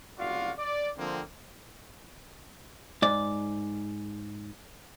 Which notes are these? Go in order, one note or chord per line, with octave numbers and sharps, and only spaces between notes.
F#1 C2 F4 F#4 D5 F5
D5
D3 F3 A#3 C4
G#2 D5